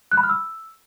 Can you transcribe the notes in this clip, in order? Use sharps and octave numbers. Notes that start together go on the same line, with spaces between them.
F#6
B5
F6
E6